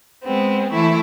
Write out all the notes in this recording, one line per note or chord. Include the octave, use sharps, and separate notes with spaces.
G#3 B3 C4
E3 A3 E4